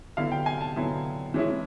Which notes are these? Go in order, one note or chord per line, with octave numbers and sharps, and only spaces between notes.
D3 F#3 B3 E4 F5
G5
G#5
A5
D3 F#3 B3 E4
E3 G#3 C#4 E4